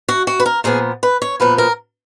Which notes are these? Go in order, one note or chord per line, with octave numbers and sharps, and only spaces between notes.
F#4
F#4
B4
A#4
A#2 F3 B3 G#4
B4
C#5
A#2 F3 B3 B4
A#4